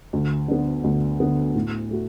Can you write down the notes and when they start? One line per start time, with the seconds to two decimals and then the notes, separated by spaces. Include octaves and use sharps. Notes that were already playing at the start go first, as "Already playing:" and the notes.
0.13 D2
0.48 D3 B3
0.84 D2
1.20 D3 B3
1.55 A2
1.91 A3 F#4